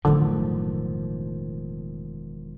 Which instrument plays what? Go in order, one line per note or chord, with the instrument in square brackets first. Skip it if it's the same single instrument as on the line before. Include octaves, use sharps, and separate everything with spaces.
[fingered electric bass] E1 D#3 F3 [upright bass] F#2 A2 [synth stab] D3